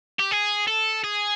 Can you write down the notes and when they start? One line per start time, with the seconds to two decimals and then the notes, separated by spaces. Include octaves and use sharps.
0.19 G4
0.31 G#4
0.67 A4
1.04 G#4